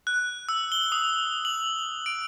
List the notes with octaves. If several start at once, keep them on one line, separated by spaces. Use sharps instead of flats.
F#6
E6
G7
D#6
F#7
D7